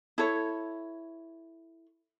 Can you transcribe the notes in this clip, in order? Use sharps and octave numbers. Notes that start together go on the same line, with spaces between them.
E4 A4 C#5